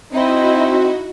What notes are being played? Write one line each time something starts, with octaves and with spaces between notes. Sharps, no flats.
C4 D#4 E4 F#4 D#5